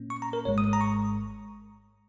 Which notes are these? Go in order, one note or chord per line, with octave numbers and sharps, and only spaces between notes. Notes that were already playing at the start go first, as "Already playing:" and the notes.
Already playing: A#2 A#3 C#4
C#6
A#5
A#4
G#1 G#2 G#3 C#5
D#6
A#5
C#6